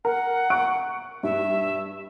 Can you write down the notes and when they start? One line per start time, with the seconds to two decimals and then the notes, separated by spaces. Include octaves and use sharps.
0.05 A#4 F#5
0.50 C#6 F#6 D7
1.23 G2 E5